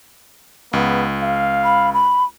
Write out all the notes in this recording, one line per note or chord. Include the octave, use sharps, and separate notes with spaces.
C#2 B3
F5
B5
B5